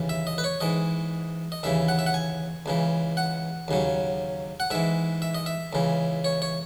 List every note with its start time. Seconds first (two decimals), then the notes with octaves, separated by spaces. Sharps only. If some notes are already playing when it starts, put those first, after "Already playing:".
Already playing: D#2 C#3 E3
0.09 E5
0.27 D#5
0.38 B4
0.44 C#5
0.61 G#2 E3 D#5
1.52 D#5
1.63 D#2 C#3 E3 E5
1.88 F#5
1.99 E5
2.06 F#5
2.14 G#5
2.66 C#2 C#3 E3
3.17 F#5
3.68 D#2 C#3 F#3
4.60 F#5
4.71 G#2 E3 E5
5.22 E5
5.35 D#5
5.46 E5
5.73 C#2 C#3 E3
6.24 C#5
6.42 C#5